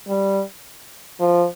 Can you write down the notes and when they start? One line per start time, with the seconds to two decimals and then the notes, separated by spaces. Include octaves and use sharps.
0.08 G3
1.20 F3